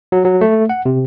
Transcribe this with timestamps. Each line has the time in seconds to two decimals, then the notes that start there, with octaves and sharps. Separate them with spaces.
0.12 F#3
0.25 F#3
0.41 A3
0.69 F#5
0.85 C3